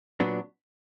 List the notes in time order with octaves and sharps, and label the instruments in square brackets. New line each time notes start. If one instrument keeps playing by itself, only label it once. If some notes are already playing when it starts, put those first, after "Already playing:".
[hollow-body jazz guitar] A#2 F#3 B3 D4